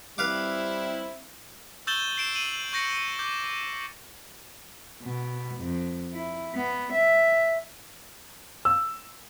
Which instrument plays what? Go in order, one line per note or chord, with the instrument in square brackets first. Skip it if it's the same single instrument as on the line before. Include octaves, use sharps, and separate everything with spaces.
[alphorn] G3 [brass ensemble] C4 E4 [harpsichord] B4 F5 D6
[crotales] C#6 E6 G6 A6 E7 G7
C7 D7 E7
D#7 F#7
C#6 G6 A#6 C#7
D6 G6
[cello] B2
F2
E4
B3
E5
[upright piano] E6